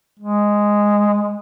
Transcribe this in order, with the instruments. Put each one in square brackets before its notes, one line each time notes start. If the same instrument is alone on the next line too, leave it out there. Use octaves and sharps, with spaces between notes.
[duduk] G#3